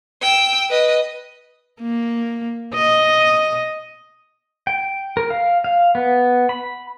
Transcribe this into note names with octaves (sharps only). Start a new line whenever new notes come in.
G5 E6
B4 D#5
A#3
D#5
G5
A#4
F5
F5
B3
B5